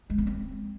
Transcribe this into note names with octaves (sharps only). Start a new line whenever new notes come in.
G#3
B3
C4